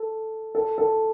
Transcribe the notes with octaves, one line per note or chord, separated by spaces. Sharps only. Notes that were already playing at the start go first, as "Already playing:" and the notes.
Already playing: A4
A4
A4